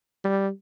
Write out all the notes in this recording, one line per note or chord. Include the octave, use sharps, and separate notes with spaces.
G3